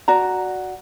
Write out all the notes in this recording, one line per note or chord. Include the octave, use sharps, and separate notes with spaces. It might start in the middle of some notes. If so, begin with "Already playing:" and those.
F#4 D5 A#5